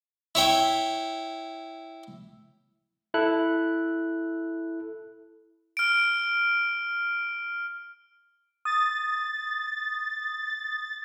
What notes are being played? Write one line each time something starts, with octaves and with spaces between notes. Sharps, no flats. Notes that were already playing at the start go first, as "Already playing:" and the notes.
E4 C#5 G5
E4 A4 F#6
F6 D7
D#6 A6